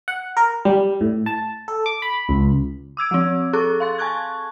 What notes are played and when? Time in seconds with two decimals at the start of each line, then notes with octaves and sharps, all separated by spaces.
0.08 F#5
0.37 A#4
0.65 G3
1.01 A2
1.26 A5
1.68 A4
1.86 D6
2.02 B5
2.29 C#2
2.97 D6 E6 G#6 D7
3.11 F3 C4
3.53 G#4 A4 C#6 D6 F#6
3.80 F5 C6 A6
3.98 G#5 A5 C#6 F#6 G#6